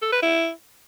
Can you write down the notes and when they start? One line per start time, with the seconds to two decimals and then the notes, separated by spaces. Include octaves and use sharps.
0.02 A4
0.12 B4
0.22 E4